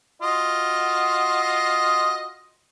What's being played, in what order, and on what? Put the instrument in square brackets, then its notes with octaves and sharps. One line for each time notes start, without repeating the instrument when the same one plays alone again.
[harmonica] F4 F#4 D#5